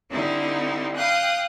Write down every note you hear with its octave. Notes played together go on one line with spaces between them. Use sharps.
D3 G3 C4 D#4 E4
F5 G5 D#6 F#6